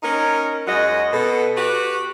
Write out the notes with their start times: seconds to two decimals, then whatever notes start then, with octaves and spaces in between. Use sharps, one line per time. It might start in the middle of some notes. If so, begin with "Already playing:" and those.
0.03 C#4 D#4 A#4
0.67 F#2 G#3 F#4 D#5
1.12 B2 A4
1.57 F#4 G4 B4